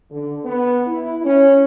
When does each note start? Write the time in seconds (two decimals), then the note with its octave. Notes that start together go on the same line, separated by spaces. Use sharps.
0.11 D3
0.45 B3
0.87 E4
1.25 C#4